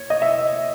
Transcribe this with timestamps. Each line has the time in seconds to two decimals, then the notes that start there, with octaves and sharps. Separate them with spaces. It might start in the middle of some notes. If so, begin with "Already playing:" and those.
Already playing: C#5
0.10 D#5
0.22 E5